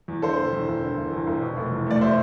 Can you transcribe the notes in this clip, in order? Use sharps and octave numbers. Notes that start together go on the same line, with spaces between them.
E2
D3 A4 C5
E1
E2
E1
D3
E1
E2
E1
B2
F1
E2
A3 D5
B2 C5 E5